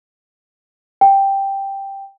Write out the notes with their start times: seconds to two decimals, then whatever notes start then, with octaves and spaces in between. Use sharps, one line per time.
1.01 G5